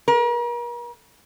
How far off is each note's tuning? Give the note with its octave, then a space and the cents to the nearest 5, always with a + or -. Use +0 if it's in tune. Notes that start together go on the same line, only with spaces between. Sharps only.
A#4 +40